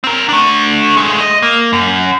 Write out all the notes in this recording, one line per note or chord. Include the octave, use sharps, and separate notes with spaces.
C4 A#4
A3 D4
G#3 A3
D#5
A#3
F#2